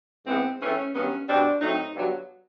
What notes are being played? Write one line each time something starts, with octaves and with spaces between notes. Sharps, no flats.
G#2 E3 G#3 B3 C4
G#2 E3 A3 C4 C#4
G2 D#3 F#3 B3 C#4
B2 G3 C4 D4
A2 F#3 A3 C4 D#4
G2 D3 F#3 B3